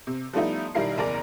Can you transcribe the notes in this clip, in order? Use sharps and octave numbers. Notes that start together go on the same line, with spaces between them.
C3
F3 G3 A3 B3 D#4 E4
B1 D#3 G3 E4 A#4 C7
F#1 E2 A#4 D5 A#5